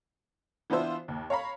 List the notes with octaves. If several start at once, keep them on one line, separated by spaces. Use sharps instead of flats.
E3 B3 D4 F4 C5 E5
D#2
C#5 F5 A#5 B5